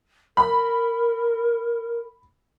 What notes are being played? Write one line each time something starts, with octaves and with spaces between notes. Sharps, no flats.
A#4 B5